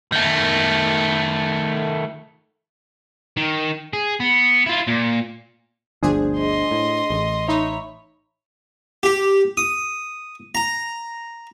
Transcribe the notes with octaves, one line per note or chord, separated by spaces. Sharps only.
D#3 A3
D#3
G#4
B3
E4 F4
A#2
G1 D2 F3 D4 G#4 C5
D#5 C6
A2
A1
D#4 C#5 E5 A#5 B5
G4
D#6
A#5